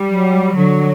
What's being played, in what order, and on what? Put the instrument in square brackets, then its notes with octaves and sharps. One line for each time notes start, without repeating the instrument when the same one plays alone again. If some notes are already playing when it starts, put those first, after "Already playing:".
Already playing: [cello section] G3
[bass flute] F#3
[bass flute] D3 [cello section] F#3